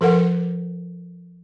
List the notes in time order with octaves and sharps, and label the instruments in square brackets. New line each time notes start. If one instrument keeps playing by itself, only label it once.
[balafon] F3 A4 A#4 F#5